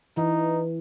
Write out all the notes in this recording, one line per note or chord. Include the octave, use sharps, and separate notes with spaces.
E3 D#4